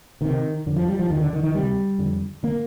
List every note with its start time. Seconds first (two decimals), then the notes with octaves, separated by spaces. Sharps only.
0.21 D2 C3 D#3
0.66 F2 D3
0.76 F3
0.88 G3
0.99 F3
1.10 D#2 D3 D#3
1.21 D3
1.33 D#3
1.43 D#3
1.54 D2 C3 G3
1.98 F2 D3
2.43 D3 A#3